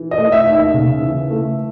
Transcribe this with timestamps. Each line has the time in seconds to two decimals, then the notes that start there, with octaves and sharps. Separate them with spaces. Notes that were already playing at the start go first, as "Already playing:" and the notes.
Already playing: E3
0.11 D#5
0.18 A3
0.32 E5
0.46 D#2
0.53 E5
0.74 C#3
1.02 E3
1.30 A3